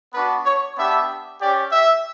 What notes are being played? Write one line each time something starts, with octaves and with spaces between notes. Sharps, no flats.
B3 D4 F#4 B4
C#5
B3 D4 G4 E5
C#4 G4 D5
E5